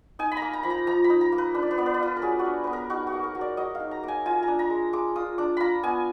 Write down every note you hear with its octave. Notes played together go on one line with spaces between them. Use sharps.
D#4 G#5
B5
A#5
A#3
A#5
F3 B5
A#5
F3 A#5
B5
D#4
A#5
A#3
B4
D4 B4
D5
B4
B3 D5
B4
D5
F4 B4
A#4
F#3 G#4
F#4
D4
B3 B4
A#4
D#4 F#4
F#4
A#3
A#4
F#3
D5
F#3 D#5
F5
D#4
A#5
A#3 G#5
F4 G#5
A#5
D4
A#5
G#3
G#3 D6
F4 D#6
D4 D6
F4 A#5 B5
B3 G#5